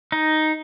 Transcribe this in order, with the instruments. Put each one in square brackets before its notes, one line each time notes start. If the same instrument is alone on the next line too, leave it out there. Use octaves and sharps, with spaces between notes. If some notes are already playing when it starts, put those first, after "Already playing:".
[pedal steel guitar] D#4